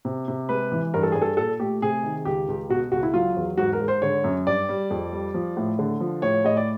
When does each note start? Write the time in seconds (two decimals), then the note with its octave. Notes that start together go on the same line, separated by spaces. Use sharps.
0.05 C3
0.28 C3
0.49 G#3 B4
0.72 E3
0.94 G2 A#4
1.03 A4
1.12 G2 G#4
1.22 A4
1.37 A#2 A4
1.60 A3 G4
1.82 C3 G#4
2.03 D#3
2.25 C#2 G4
2.48 C#2
2.70 B2 F#4
2.92 C#2 F#4
3.03 E4
3.14 F#3 F4
3.36 E2
3.57 G#2 F#4
3.73 A#4
3.80 G#2
3.88 C5
4.02 D3 C#5
4.24 F#2
4.47 G2 D5
4.69 G3
4.91 F2
5.12 G3
5.34 F3
5.57 A2
5.79 D3
6.00 F3
6.22 A2 C#5
6.45 A2 D#5
6.57 D5